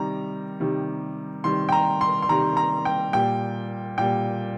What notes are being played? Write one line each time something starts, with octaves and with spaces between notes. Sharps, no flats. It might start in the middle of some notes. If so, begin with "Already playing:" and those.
Already playing: C3 D#3 G3 A#5
C3 D#3 G3
C3 D#3 G3 C6
G5
A#5
C6
C6
C3 D#3 G3 A#5
A#5
G5
A#2 G3 G5
A#2 G3 G5